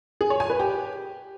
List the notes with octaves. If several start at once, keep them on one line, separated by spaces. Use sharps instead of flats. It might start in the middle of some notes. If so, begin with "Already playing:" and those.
G#4
C#5
G#5
B4
G4